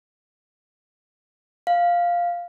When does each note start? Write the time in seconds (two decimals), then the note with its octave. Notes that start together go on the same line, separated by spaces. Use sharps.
1.67 F5